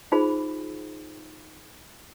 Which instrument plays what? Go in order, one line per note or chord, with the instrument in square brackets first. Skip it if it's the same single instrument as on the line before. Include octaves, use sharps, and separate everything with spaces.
[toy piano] D#4 F4 G#4 C5 B5